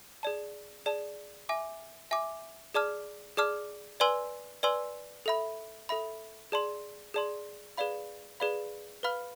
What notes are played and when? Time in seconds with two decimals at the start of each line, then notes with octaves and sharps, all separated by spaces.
0.23 G#4 D5 A5
0.86 G#4 D5 A5
1.49 E5 G#5 D6
2.11 E5 G#5 D6
2.74 G#4 D5 A5 D6 F6
3.37 G#4 D5 A5 D6 F6
4.00 B4 D5 G#5 C6 E6
4.63 B4 D5 G#5 C6 E6
5.26 A4 E5 B5
5.89 A4 E5 B5
6.52 G#4 D5 A5 C6
7.14 G#4 D5 A5 C6
7.77 G#4 B4 D5 F5 B5
8.40 G#4 B4 D5 F5 B5
9.03 B4 F5 B5 F6